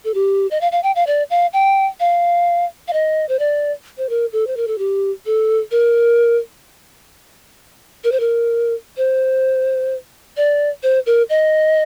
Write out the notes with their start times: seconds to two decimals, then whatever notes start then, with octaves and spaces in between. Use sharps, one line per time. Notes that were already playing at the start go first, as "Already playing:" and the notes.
0.05 A4
0.14 G4
0.51 D#5
0.61 F5
0.72 F5
0.83 G5
0.96 F5
1.07 D5
1.30 F5
1.53 G5
2.00 F5
2.88 F5
2.93 D#5
3.29 C5
3.39 D5
3.98 C5
4.09 A#4
4.33 A4
4.47 C5
4.57 A#4
4.67 A4
4.78 G4
5.26 A4
5.71 A#4
8.04 A#4
8.12 C5
8.20 A#4
8.97 C5
10.37 D5
10.83 C5
11.06 A#4
11.30 D#5